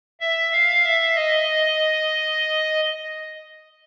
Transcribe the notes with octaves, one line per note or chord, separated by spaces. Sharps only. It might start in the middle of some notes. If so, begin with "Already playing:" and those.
E5
F5
E5
D#5